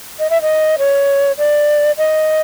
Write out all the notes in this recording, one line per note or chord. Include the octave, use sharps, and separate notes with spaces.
D#5
E5
D#5
C#5
D5
D#5